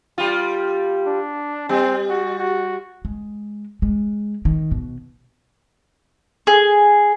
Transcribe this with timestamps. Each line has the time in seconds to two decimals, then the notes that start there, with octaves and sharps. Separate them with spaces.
0.18 G3 F4
1.07 D4
1.69 G3 C4
2.09 F#4
2.39 F#4
3.05 G#3
3.82 G#3
4.45 D#3
4.72 B2
6.47 G#4